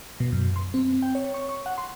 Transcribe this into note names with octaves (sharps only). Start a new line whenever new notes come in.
B2
F#2
C6
C4
G5
C#5
C#6
C#6
F#5
C6